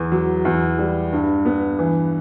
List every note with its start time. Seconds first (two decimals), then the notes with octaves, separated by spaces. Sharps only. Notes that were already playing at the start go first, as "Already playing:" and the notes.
Already playing: E2
0.12 F#3
0.45 E2
0.78 G3
1.13 G2
1.45 B3
1.79 E3